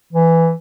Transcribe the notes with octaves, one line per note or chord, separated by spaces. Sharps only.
E3